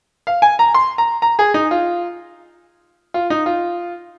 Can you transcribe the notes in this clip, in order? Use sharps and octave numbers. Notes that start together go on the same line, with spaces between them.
F5
G#5
A#5
C6
A#5
A#5
G#4
D#4
F4
F4
D#4
F4